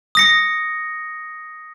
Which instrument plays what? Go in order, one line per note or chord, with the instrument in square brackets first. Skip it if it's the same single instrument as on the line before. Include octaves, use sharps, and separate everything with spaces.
[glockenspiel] D#6 A#6 C#7